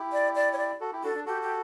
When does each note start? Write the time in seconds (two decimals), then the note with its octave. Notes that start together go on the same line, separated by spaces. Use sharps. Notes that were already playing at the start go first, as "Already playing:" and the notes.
Already playing: E4 G4
0.13 D5
0.35 D5
0.53 C#5
0.58 D5
0.80 F#4 A4
0.93 E4 G4
1.03 D4 F#4 A4
1.14 D4
1.26 F#4 G4 A4
1.42 G4